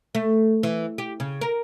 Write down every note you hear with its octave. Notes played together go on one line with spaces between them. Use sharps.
A3
E3
G4
C#3
A#4